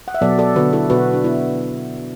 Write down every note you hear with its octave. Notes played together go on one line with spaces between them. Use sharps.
F#5
E5
B2 F#3 B3 A4 D5
A4 D5
D3 B3 F#4 B4
E4 A4
B2 B3 F#4 B4
D4
B3 E4